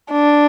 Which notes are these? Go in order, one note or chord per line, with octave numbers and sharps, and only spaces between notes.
D4